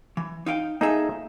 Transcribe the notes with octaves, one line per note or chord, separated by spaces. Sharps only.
E3
D#4 F5 G5
A#3 D#4 G#4 A4 E5